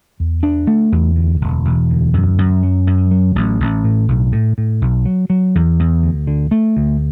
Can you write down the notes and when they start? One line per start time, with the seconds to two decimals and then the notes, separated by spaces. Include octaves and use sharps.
0.20 E2
0.43 D4
0.67 A3
0.92 E2
1.16 D2
1.41 E1
1.65 E1
1.90 D2
2.14 F#2
2.38 F#2
2.63 F#3
2.87 F#2
3.11 F#3
3.35 A1
3.60 A1
3.84 A2
4.08 B1
4.32 A2
4.58 A2
4.82 B1
5.05 F#3
5.30 F#3
5.55 E2
5.80 E2
6.03 D2
6.27 D3
6.51 A3
6.77 D2